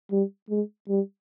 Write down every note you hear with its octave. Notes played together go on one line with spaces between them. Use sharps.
G3
G#3
G3